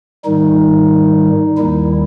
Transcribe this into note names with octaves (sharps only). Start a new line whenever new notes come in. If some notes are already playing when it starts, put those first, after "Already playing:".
G#2 D#3 G3 D#4
D#2 D#3 G3 E4